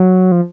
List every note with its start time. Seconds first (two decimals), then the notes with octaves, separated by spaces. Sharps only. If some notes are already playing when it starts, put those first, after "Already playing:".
Already playing: F#3
0.32 F3